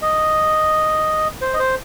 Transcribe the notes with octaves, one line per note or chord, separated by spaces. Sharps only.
D#5
C5
D#5
C5